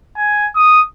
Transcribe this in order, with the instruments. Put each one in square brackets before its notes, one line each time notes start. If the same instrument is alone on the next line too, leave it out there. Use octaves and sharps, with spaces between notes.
[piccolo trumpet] G#5
D#6